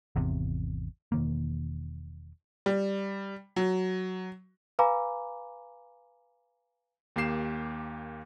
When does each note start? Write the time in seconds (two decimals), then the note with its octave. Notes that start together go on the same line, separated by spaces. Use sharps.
0.16 G#1 E2 C3
1.12 E1 D#3 A#3
2.66 G3
3.56 F#3
4.79 B4 F5 G#5 A#5 B5 D6
7.16 D#2 A#3 G4 C7 E7